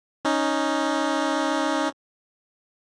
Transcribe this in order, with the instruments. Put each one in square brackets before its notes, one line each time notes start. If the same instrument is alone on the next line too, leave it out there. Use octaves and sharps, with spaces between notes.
[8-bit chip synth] C#4 D#4